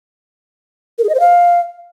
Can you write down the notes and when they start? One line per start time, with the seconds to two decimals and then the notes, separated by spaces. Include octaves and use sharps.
0.98 A#4
1.04 G#4
1.09 D#5
1.14 C5
1.20 F5